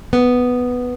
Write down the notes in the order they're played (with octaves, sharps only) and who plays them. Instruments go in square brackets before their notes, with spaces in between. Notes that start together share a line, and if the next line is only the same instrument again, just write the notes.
[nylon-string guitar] B3